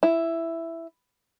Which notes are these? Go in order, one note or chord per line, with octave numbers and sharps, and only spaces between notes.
E4